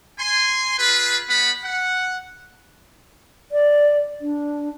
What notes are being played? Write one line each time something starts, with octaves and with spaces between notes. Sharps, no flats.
G#5 C6
F4 G#4 B4
G3 B3 F#5 B5
F#5
D5
D4